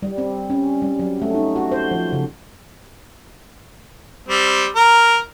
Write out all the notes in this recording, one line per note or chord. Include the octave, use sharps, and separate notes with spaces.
G3
C4
C#4
G3
F#3
A3
D#4
F#4
C5
F3
C#3
G3 C4
A#4